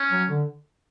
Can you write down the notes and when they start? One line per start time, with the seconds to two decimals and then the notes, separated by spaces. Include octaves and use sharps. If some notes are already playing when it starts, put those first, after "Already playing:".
Already playing: C#4
0.11 F#3
0.29 D3